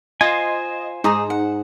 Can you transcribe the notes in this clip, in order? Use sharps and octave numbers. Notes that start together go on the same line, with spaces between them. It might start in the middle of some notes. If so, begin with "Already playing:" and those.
F4 C5 D#5 G#5
G#2 D#4 G#4 A#5 D#6
F#5